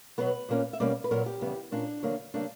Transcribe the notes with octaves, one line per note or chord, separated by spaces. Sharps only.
B2 F#3 B3 B4
A#2 A#3 C#4
E5
B2 G3 A#3 C#4 D5
B4
A#2 F#3 B3 A#4
G4
E2 C#3 G3 B3
A#2 A#3 C#4 D4
E2 D3 F#3 A#3
C#3 G3 A#3 D4